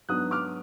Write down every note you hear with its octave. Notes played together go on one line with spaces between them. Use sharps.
G#2 F#3 B3 D4 D#6 F#6
D6 F6